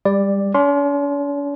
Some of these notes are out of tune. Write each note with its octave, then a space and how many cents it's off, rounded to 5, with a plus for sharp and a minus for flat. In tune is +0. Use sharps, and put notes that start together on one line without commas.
G3 +25 D5 +5
C#4 +45 C6 +0